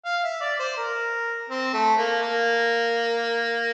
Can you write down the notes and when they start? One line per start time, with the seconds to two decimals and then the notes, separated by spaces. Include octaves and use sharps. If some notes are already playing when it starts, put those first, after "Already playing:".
0.05 F5
0.23 E5
0.41 D5
0.59 C5
0.77 A#4
1.50 C4
1.73 A3
1.97 A#3
2.22 A#3